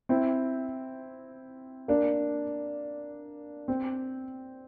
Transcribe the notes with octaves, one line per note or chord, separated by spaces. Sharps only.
C4 E4
A#3 D4
C4